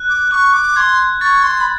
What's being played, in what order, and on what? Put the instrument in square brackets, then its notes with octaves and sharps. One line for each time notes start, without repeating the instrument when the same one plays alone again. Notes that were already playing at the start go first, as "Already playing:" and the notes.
Already playing: [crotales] F#6
[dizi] D6
[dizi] C#6 [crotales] F#6
[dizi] D6
[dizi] C6 [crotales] G#6
[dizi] C#6 [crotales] A6
[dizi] C6
B5